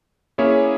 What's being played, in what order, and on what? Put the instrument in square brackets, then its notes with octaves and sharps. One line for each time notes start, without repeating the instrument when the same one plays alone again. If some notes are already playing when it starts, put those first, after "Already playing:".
[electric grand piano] A#3 C#4 E4 G#4 C#5